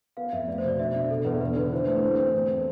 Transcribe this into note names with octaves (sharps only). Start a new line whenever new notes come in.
B3 F5
F2 E5
A3 D5
C5
B2 D5
D4 E5
D4 E5
B2 A4
E2 B4
E2 B4
D3 B4
E3 C5
A3 C5
B4
A3 C5
C4
E2